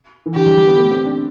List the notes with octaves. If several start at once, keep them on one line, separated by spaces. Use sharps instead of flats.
E3
D3 G4
G3
G3
B3
A3
C4
D4